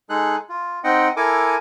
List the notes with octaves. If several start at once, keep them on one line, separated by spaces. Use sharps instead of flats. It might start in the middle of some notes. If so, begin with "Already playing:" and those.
G#3 D#4 G#4 A4 F#6
F4
C4 D#4 D#5 F#5 G5
E4 A4 A#4 G#5 D6